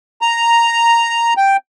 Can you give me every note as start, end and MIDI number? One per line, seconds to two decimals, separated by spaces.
0.22 1.34 82
1.37 1.57 79